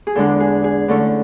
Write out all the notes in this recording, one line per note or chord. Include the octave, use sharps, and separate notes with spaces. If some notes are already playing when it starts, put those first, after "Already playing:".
G#4
E2 D3 G#3 D4 A4
G#4
G#4
D3 A3 C#4 E4 A4